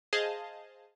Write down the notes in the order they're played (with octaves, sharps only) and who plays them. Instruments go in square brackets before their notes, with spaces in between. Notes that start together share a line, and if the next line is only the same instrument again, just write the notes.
[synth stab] G#4 C5 D#5 F5 A5